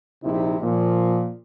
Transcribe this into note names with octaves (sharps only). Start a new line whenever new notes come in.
A#1 C3 D#4 E4
A#2 F3